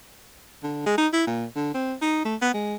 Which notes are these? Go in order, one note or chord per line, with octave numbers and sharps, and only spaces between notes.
D3
G#3
D#4
E4
A#2
D3
C4
D#4
A3
B3
G#3